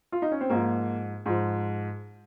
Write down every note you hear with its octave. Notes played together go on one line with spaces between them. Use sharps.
F4
D#4
C#4
C4
G#2 F3 A#3
G#2 F3